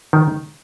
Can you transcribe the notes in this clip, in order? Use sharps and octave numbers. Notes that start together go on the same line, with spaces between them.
D#3